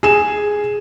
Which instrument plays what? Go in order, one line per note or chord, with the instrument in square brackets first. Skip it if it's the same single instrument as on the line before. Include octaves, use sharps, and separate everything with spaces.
[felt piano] G#4 E7